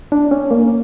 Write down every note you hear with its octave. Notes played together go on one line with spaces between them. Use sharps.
D4
C#4
A#3